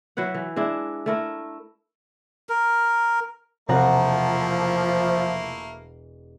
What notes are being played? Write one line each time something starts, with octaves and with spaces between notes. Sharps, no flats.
F#3 E4 B4 F#5
E3
G#3 D4 E4
A3 E4 A#4
A#4
E1 C3 F3 A3 A#3 E4 F#5 A#5